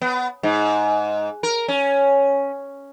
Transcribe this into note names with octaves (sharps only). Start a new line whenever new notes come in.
B3
G#2
A#4
C#4